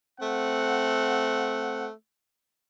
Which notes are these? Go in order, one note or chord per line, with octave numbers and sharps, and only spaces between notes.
A3 C4 F#5